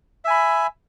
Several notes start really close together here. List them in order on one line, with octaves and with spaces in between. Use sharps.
E5 G#5 B5